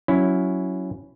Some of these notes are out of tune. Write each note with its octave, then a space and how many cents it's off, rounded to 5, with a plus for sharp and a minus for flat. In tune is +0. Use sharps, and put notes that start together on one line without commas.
F#3 +0 C#4 +0 E4 +0